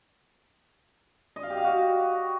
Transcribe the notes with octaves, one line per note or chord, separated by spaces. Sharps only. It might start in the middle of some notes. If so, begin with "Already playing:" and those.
D#5
F5
G4
F5
F#4